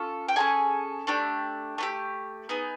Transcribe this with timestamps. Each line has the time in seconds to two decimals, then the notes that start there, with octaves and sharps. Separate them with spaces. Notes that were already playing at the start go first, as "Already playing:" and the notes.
Already playing: C#4 F4 A4
0.28 G5
0.36 C#4 F4 G#4 A4 G#5
1.07 A3 D4 G4
1.78 A3 D4 G4
2.49 B3 D#4 G#4